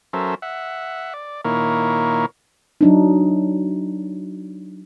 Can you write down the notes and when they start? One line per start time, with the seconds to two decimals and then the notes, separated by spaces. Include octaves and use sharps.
0.13 F#3 C#4 A4 A#4 C5 E5
0.42 E5 F#5
1.14 D5
1.45 A#2 D#3 A#3 E4 A#4 C#5
2.81 F#3 D4 D#4